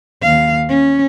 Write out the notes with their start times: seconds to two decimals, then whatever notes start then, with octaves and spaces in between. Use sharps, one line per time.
0.22 D#2 F5
0.69 C#4